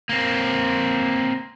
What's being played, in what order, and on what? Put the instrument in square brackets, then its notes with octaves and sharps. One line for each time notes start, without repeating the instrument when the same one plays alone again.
[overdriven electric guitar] A#3 C4